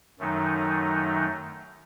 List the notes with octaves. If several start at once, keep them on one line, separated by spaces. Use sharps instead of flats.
F#2 D#3 F#3 A3 D#4